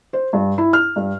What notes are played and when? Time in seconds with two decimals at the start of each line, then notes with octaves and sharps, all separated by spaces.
0.13 C5
0.33 G2
0.58 E4
0.73 F6
0.96 G2